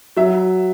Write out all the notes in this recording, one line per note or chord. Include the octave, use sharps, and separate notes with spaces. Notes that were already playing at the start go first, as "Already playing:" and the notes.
F#3 E5